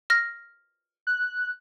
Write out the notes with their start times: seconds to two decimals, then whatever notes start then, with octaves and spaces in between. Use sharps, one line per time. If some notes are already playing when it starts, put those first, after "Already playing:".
0.10 F6 A#6
1.07 F#6